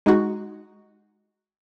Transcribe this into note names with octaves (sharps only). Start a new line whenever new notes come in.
G#3 D#4 F#4